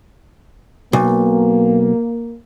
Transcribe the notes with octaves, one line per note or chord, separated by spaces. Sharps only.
B1 A#3